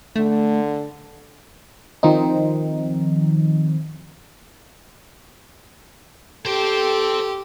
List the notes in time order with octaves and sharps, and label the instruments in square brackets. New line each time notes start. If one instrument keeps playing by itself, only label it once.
[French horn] D3 [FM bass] A3
[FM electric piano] D#3 F3 C4 D#4
[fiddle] G4 [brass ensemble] A4 [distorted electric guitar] C5 G5